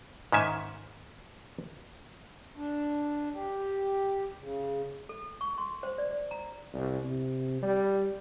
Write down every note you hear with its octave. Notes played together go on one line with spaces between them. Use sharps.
G#2 D#3 C#4 E5 G#5
D4
G4
C#3
A4
C#6
C6
C5
D5
D5
A#5
C2
C3
G3